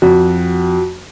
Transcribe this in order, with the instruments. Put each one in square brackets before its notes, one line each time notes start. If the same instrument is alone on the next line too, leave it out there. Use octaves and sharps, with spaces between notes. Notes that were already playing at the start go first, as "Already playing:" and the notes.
[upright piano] F2 [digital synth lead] F#4